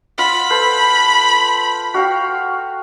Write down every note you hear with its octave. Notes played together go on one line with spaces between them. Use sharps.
F4 F#5 B5
A4 B4 C5
F#4 F5 G5